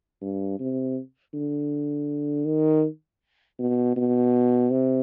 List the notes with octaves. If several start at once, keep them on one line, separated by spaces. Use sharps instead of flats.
G2
C3
D3
D#3
B2
B2
C3